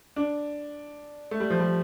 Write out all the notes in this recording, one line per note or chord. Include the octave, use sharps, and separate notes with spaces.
D4
A3
G3
F3
G3